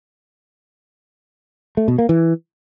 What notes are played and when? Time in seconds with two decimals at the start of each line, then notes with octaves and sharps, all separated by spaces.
1.77 A3
1.88 B2
1.98 A#3
2.09 E3